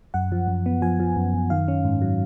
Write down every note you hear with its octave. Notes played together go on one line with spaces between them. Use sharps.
F#2 F#5
F3
F#2
B3
F3 G#5
F3
F#2
F#2
D#3 F5
C#4
G#2
F#3